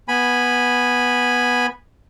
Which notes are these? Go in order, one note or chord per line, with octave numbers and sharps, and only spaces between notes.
B3 G#5 B5